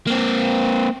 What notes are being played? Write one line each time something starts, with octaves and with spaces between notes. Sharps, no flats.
A#3 C4